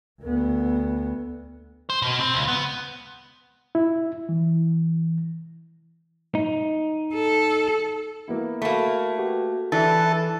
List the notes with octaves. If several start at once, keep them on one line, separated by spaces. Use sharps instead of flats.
D2 B3
C5
B2
C4
C#2
B3
E4
E3
D#4
A4
A#3 B3 E4
A3 A#3 F#4 B5
F#4 G4 B4
E3 D4 A4